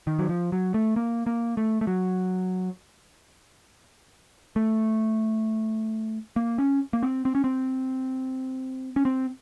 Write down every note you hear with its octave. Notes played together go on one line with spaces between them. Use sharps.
D#3
F#3
F3
F#3
A3
A#3
A#3
A3
A3
F#3
A3
A#3
C#4
A#3
C4
C4
C#4
C4
C#4
C4